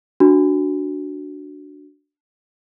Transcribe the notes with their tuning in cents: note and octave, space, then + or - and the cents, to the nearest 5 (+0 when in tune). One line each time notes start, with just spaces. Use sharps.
D4 +0 F#4 +0